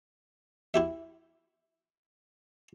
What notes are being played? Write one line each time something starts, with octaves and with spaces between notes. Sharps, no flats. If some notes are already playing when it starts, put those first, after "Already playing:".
E4 G4 E5